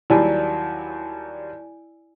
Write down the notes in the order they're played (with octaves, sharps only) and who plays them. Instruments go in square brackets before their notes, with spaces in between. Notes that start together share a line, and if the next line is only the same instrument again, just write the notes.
[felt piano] D#2 F#3 G3 [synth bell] E4 D5 G#5